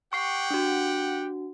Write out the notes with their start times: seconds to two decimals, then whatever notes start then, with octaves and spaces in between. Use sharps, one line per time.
0.13 G4 F#5 G5 C#6 C7
0.50 D4 F#4